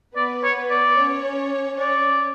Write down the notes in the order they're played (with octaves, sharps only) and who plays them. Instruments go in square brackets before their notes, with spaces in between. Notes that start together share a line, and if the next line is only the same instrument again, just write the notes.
[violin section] B3 B4 [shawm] D5
[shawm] C#5
D5
[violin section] C#4 C#5
[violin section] C#4 C#5 [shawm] D5